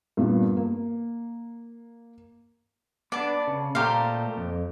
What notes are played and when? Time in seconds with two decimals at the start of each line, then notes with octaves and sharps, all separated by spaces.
0.17 G2 A#2 B3
0.57 A#3
3.12 B3 D4 D5 A5
3.47 C#3
3.75 A#2 A3 G4 C5 F5 A#5
4.37 F2